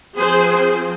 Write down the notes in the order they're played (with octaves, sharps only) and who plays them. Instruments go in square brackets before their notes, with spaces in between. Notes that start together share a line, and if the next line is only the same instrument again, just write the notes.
[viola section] F3 C4 G#4 C5